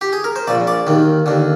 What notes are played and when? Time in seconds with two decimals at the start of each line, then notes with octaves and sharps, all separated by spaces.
0.01 G4
0.13 G#4
0.24 A#4
0.36 C5
0.47 A#1 A#2 D5
0.67 D5
0.87 D#2 D#3
1.26 D#2 D3